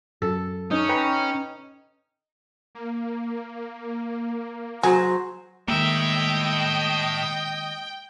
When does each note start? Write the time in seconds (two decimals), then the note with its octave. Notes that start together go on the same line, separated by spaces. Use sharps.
0.22 F#2 A4
0.71 C#4 D#4
0.89 B4 G5 A#5
2.75 A#3
4.83 F#3 F#4 G#4 C5
5.68 A2 D#3 G#3 A#3 D#5 E5 G5